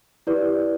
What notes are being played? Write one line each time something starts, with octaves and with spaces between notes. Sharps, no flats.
E4 G4 B4 D5